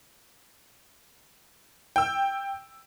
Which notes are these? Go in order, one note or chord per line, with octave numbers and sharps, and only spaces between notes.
G5 E6